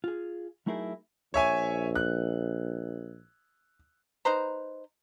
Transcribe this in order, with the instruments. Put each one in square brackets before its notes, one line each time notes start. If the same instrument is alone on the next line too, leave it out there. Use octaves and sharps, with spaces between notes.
[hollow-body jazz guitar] F4 G#4
F#3 A3 D#4 E4 G#4 A#4
[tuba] A#1 [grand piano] C#5 E5 G#5
[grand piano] F#6
[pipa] D#4 B4 C5 A#5